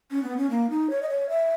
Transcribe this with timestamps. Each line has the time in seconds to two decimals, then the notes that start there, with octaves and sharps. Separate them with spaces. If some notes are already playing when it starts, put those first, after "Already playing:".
0.11 C#4
0.23 B3
0.37 C#4
0.50 A#3
0.70 D#4
0.90 C#5
1.03 D#5
1.09 C#5
1.29 E5